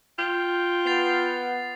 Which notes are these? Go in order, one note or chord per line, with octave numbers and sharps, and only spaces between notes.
F4 G5
B3 A6 C7 F7